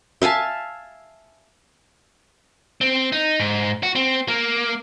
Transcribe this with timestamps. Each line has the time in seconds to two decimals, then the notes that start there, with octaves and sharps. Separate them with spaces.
0.22 E5 F5 G#5 A5
2.81 C4
3.12 D#4
3.40 G#2
3.83 F#4
3.95 C4
4.28 A#3